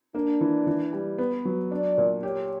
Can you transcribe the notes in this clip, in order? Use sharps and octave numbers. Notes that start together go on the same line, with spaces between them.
A#3 D4
E3
E3
G3
B3 B4
F#3
D4 D5
A#2
G4 C#5